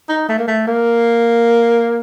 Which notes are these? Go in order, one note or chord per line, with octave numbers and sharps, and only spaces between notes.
D#4
A3
A#3
A3
A#3